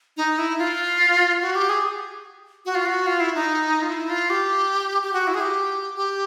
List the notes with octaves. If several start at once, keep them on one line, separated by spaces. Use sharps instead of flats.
D#4
E4
F4
F#4
G4
G#4
F#4
F4
F#4
F4
E4
D#4
F4
E4
F4
G4
G4
F#4
E4
G#4
G4
G4